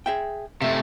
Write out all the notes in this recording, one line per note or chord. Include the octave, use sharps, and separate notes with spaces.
G#4 E5 G5
C3 A3 E5